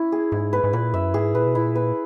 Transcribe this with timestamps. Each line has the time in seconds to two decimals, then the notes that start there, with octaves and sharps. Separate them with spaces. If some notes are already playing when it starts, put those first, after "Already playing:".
Already playing: C#4 E4
0.12 G#4
0.32 G#2 E4
0.53 B4
0.64 G#2
0.73 A#2 B4
0.94 F#2 E5
1.14 G#2 G#4
1.35 A#2 B4
1.46 B2
1.55 A#2 E4
1.75 B4